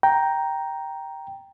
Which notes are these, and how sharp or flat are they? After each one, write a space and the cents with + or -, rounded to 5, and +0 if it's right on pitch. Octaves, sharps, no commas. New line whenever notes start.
G5 +0 A#5 +5